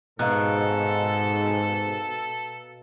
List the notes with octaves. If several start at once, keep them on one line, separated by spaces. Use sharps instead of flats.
G#2 B2 A4 F5 A#5 F#6